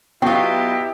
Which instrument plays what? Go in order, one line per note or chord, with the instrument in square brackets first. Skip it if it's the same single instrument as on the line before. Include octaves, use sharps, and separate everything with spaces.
[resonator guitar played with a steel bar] F#3 F4 [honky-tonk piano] B3 [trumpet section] E4 G4 D#5 [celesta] G5